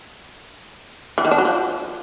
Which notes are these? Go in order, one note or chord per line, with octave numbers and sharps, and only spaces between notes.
E3
D#3
D4
F#3
F3